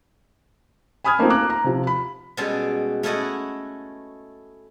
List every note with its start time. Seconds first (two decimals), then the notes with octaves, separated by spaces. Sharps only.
1.04 G#5 B5 D#6 F6 G#6
1.19 A3 A#3 C4 D#4 F4
1.30 A#5 D6 F#6
1.50 A#5
1.64 C3 F3
1.87 B5
2.37 B2 G3 G#3 C#4 A4
3.03 A3 C#4 E4 A4 D#5 F#5